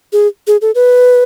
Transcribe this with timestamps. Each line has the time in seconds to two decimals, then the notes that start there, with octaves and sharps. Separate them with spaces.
0.13 G#4
0.47 G#4
0.61 A4
0.75 B4